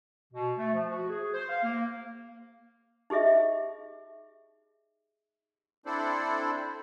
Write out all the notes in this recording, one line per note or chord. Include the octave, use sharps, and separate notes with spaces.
B2
A3
F3
F#4
G#4
C5
F5
A#3
D#4 G4 G#4 D#5 E5
C4 D4 E4 A4 C5 D5